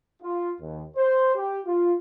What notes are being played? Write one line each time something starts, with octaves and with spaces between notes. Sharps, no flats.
F4
D#2
C5
G4
F4